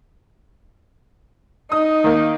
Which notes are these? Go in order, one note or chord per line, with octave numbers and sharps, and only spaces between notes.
D#4 D#6
D#3 A#3